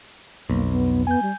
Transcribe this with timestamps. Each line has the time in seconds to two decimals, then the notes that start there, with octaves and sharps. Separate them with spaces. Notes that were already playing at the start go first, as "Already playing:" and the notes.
0.49 B1 F2 A#3
0.71 B3
1.07 B3 G#5 G6
1.22 G3